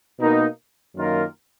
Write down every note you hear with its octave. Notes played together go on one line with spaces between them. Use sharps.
B2 A#3 D#4 A#4
F#2 D#3 A#3 F4 A#4